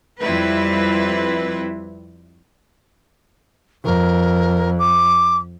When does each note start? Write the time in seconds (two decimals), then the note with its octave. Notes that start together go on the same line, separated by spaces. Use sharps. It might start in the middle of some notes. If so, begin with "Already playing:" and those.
0.21 F2 G3 C4 E4 B4
3.84 F2 A#4
4.79 D6